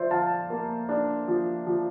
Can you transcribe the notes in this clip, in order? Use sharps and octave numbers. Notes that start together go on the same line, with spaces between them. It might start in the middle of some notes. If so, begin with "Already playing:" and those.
Already playing: F3 C5 D5 E5
F3 F5 A5
A#3
D4
F3
F3